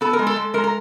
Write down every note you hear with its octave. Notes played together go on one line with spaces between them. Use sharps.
B3 A4
A#4
G#3
A4
G#3
G#3 A#4
A#4